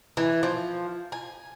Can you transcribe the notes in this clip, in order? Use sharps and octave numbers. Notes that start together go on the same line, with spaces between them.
E3
F3
G#5